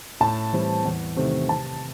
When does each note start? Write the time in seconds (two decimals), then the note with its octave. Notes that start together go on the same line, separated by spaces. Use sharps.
0.20 A2 A5
0.53 E3 G3 C4
0.85 E2
1.16 C3 D#3 A3 C4
1.49 C3 A5